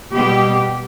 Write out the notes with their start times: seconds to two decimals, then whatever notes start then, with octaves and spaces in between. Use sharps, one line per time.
0.12 B2 G3 G4